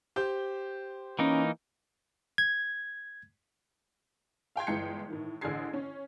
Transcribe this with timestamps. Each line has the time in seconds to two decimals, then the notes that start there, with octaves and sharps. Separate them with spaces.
0.16 G4 C5 G6
1.19 E3 A#3 C#4 D#4
2.38 G#6
4.56 F5 G5 C6 G#6
4.67 G1 E3 G#3 G5 G6 C#7
5.08 A2 D#3 E3
5.41 A1 D3 D4 G#4 G#6 C7
5.73 C#4